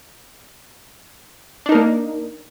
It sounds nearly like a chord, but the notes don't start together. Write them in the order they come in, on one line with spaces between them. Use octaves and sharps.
D4 D#4 A#4 A#3